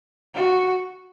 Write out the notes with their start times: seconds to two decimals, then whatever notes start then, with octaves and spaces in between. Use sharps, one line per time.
0.35 F#4